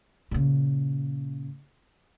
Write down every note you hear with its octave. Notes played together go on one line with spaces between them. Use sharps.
A#2 C#3